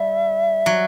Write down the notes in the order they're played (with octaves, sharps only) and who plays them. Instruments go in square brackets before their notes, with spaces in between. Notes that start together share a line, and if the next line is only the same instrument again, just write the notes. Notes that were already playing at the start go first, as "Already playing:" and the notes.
Already playing: [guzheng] G3 [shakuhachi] E5
[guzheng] F#3